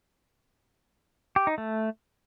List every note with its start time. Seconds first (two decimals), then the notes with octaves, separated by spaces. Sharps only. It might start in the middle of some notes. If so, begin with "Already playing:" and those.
1.36 G4
1.47 D#4
1.58 A3